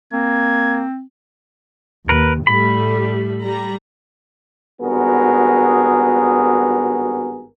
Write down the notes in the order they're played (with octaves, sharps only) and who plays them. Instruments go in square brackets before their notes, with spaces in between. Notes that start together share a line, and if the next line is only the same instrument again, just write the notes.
[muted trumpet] A#3 [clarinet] C4 [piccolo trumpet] G#6
[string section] D#2 [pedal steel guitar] A#4 B4
[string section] A2 G3 A3 [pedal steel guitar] B5
[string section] G3 A#5
[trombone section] G#1 G2 B3 F#4 G#4 A#4